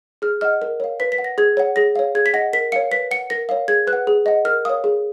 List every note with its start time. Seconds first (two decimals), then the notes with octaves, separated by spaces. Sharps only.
0.22 G#4 F6
0.41 D#5 F#5 F6
0.62 A#4
0.80 C#5 F5
1.00 B4 B6
1.12 B6
1.18 F#5
1.24 A#6
1.38 G#4 G#6
1.57 C#5 F#5
1.76 G#4 A#6
1.96 C#5 F5
2.15 G#4 G#6
2.26 B6
2.33 D#5 F#5 A#6
2.53 A#4 B6
2.72 C#5 F5 C#7
2.91 B4 B6
3.11 F#5 C#7
3.30 A#4 A#6
3.49 C#5 F5
3.68 G#4 G#6
3.87 B4 F#6
3.93 F#5
4.07 G#4
4.26 D#5 F#5
4.45 A#4 F6
4.65 C#5 F5 D#6
4.84 G#4